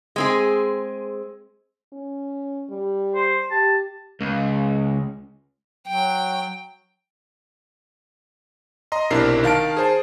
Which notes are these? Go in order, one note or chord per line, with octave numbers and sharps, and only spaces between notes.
G#3 C4 G#4
C#4
G3
C5
G4 A5
C#2
F#3 G5
D#5 A#5 C6
B1 C3 D4 E4 A#4 C7
D#3 F5 A5 D7
G#4 C5 A5